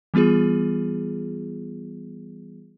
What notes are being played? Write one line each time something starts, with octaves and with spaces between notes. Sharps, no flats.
E3 G3 B3 F4 G#4